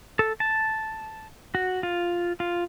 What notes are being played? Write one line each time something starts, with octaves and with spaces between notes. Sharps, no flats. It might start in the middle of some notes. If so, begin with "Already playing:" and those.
A4
A5
F#4
F4
F4